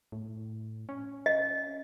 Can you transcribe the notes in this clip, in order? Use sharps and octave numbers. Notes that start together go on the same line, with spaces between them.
A2
C#4
D#5